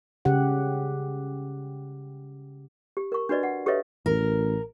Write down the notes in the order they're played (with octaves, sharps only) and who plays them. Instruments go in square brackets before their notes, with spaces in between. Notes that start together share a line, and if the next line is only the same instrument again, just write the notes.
[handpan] C#3 G4 F#5
[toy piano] G4
A#4 C#6
D4 F#4 B4 D5 D#5
F#5
G4 A4 B4 C#5 D#5 E5
[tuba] A1 [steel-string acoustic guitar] A#4